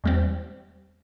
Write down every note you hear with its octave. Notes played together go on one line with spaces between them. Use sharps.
E2 G3 C4